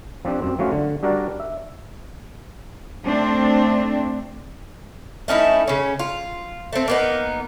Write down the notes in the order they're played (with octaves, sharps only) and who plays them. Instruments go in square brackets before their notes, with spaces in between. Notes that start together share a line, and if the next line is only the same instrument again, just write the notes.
[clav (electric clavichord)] F3 C4 D4 G4
F#2 C4
F3 F#3 A3 C#4 F4 F#4
D3
G3 D4 F#4 A#4 D5
E5
[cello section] A3 C4 D4
[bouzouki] A3 C#4 D#4 E4
C#3 C#4
F4
A3 C4
A#3 B3 D#4